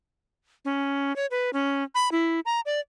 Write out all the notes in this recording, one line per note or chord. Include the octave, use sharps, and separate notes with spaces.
C#4
C#5
B4
C#4
B5
E4
A#5
D5